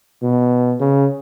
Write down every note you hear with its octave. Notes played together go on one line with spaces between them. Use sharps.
B2
C#3